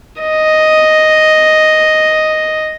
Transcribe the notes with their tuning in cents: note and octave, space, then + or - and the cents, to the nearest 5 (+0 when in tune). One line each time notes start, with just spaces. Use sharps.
D#5 +0